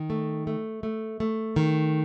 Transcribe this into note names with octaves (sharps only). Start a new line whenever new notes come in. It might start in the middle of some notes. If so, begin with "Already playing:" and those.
Already playing: D#3
A3
A3
A3
A3
D#3